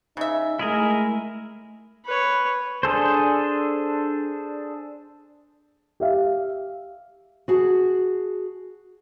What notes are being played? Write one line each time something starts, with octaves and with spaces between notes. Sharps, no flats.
C#3 D#4 E5
G#3 A3 E4 G#4 A#4
B4 C#5
D4 G#4 A4 C5
G4 E5 F5
F#4 G#4 A5